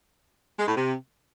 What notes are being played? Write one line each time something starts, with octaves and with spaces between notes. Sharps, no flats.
G#3
A2
C3